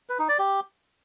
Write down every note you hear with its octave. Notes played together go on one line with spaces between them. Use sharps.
B4
D#4
D5
G4